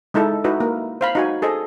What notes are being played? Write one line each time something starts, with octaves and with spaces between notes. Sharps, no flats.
G#3 D#4 E4 A4
D#4 E4 F#4 B4 D#5
A#3 A#4
C5 F5 B5
D#4 F#4 G#5
G#4 A4 C5 D#5